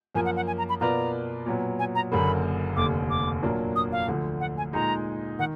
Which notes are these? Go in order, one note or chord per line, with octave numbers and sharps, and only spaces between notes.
F#2 F3 A#3 G#5
F#5
F#5
G#5
A#5
B5
B2 A#3 F4 B4 D5 A#5
A#2 F#3 B3
G#5
A#5
F#1 F#2 D3 F#3 A#3 B5
F1 D#2 D3 D6
D6
A#2 F#3 A#3 D4
D#6
F5
D2 D3 F3
F#5
G#5
A#2 G#3 D#4 A#5
D#3 F#5